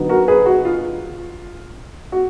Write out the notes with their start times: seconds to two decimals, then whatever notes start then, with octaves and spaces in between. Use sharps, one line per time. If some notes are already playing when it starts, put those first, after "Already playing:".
Already playing: D3 F#3 B3 D#4
0.09 F#4 A#4
0.28 G#4 B4
0.46 F#4
0.65 F4
2.12 F#4